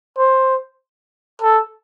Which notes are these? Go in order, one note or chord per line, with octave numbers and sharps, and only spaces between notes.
C5
A4